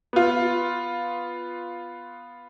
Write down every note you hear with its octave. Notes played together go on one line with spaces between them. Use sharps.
B3 F4